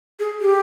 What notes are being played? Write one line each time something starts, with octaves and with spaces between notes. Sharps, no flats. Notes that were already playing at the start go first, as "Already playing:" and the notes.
G#4
G4